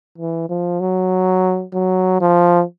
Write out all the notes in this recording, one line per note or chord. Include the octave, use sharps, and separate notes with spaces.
E3
F3
F#3
F#3
F3